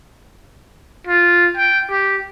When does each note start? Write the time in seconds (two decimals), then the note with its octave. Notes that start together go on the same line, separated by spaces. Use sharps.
1.07 F4
1.57 G5
1.91 G4